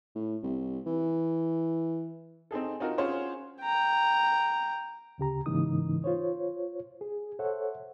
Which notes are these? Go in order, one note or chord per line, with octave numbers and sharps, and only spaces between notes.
A2
C2
E3
C4 D#4 G#4 A4
C4 D#4 F4 F#4 A#4
C#4 F4 G#4 C5 C#5 F#5
G5 A#5
D2 C#3 G4 A#5
G#2 C#3 E3 A#3 D#4 D#6
F4 C5 C#5
G#4
A4 C5 C#5 E5 F#5